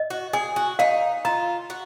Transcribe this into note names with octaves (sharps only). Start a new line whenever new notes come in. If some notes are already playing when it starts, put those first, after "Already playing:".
Already playing: D#5
F#4
G#4 G#5
F#4
D#4 F5
F4 A#5
F#4